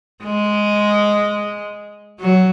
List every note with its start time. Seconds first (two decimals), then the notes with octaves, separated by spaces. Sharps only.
0.24 G#3
2.21 F#3